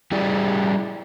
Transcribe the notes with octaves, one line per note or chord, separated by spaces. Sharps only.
G3 E4 G4 G#4 D5